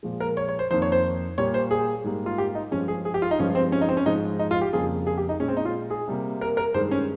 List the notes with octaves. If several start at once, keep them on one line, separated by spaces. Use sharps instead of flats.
A#2 F3 G#3
A#4
C#5
C#5
C5
F2 D#3 A#3 C5
C#5
C5
A#2 G3 A#3 C#5
C5
G#4
G#2 G3 A#3
F4
G4
D#4
G2 F3 G#3 C#4
G#4
G#4
G4
F4
D#4
G2 F3 G#3 C#4
C4
C#4
D#4
C4
C#4
G#2 F3 G#3 D#4
D#4
F4
G4
F2 C#3 G3 A#3 G#4
G#4
G4
D#4
A#2 G#3 C#4
C4
D#4
F4
G#4
C3 G3 A#3
A#4
A#4
G2 D#3 G#3 C5
C#4